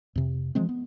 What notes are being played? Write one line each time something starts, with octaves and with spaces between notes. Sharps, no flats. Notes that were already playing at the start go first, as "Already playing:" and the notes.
F2 C3
E3 F3 G#3 C4
B3